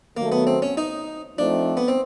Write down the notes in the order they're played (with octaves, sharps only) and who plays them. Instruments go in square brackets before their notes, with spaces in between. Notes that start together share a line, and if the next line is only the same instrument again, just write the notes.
[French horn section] D#3 F#3 A3 [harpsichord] A#3
[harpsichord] B3
C4
C#4
D#4
[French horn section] F3 A3 C4 D#4 [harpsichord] D4
[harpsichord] B3
C4